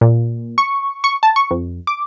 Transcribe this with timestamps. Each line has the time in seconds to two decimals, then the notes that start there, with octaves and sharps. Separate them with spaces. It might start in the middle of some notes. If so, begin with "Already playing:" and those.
0.01 A#2
0.58 C#6
1.04 C#6
1.23 A5
1.36 C#6
1.51 F2
1.87 D6